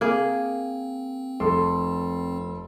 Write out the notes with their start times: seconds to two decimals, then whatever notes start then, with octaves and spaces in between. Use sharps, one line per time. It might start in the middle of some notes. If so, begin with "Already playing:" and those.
0.01 A#3 C4 G#4
1.40 F1 A4 C6